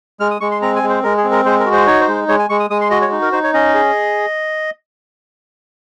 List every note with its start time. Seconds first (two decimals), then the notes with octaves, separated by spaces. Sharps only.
0.20 G#3 F6
0.31 D#6
0.41 G#3 C#6
0.51 C6
0.62 C4 A#5
0.76 G#5
0.83 G#3
0.90 C5
1.04 G#3 A#4
1.17 G#4
1.24 C4
1.31 A#4
1.45 G#3 C5
1.60 A#4
1.66 F#4
1.73 C5
1.87 D#4 C#5
2.01 C5
2.08 G#3
2.28 G#3 C#5
2.39 G#5
2.50 G#3 C#6
2.60 D#6
2.70 G#3 D#6
2.81 C6
2.91 F#4 D#5
3.02 C#5
3.12 D#4
3.22 A#4
3.32 D#4 C5
3.44 C#5
3.54 C#4 D#5
3.74 G#4